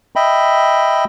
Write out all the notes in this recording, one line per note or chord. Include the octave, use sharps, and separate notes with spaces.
D#5 E5 G5 B5